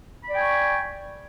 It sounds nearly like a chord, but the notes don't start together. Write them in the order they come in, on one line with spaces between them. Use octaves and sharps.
B5 D5 G5 G#5 C#6